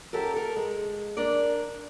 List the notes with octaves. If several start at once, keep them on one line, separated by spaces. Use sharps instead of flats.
F#2 G4 A4 A#4
A4 A#4
G#3
D4 A#4 D5